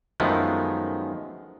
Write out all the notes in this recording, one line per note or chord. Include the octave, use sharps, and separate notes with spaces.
F#2 D#3 F3 G#3 A3 B3